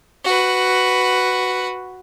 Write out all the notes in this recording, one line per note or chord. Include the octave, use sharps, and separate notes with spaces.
F#4 B4